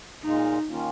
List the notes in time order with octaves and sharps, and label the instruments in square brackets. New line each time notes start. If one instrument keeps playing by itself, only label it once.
[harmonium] A#2 G#3 F4 [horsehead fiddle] D#4
[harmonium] D#3 A#3 C#4 F4